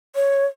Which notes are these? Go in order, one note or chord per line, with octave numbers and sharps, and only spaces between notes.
C#5